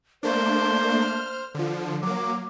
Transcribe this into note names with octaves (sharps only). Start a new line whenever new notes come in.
A3 A#3 D4 C5
F6
D3 F3
F#3 A#3 D6